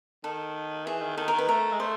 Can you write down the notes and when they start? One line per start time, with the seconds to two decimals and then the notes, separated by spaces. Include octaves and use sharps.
0.24 D#3 A4
0.86 E3 G#4
1.02 D#3
1.17 D#3 A4
1.28 A#4
1.33 D#3
1.39 B4
1.48 A3 A#4
1.73 G#3
1.80 A3 C5